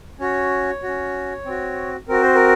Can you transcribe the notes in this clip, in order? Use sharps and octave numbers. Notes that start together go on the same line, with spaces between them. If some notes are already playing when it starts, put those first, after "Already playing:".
C#4 F#4 C#5
C#4 F#4
C4 F#4
C4 F#4 A#4
C5
A#4